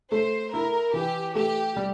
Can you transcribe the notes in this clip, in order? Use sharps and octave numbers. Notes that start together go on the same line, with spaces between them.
A3 C5
E4 A#4
E3 G4
A3 G4
G3